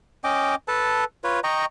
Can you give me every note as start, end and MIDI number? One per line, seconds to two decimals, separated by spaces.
0.24 0.55 61
0.24 0.55 75
0.24 0.55 79
0.24 0.55 86
0.68 1.04 69
0.68 1.04 71
0.68 1.04 81
1.24 1.40 65
1.24 1.40 71
1.24 1.40 73
1.44 1.65 75
1.44 1.65 79
1.44 1.65 82
1.44 1.65 85